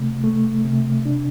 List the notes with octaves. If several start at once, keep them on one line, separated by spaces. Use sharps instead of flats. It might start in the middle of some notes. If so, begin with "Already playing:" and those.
Already playing: C3 A3
A3
C3
D4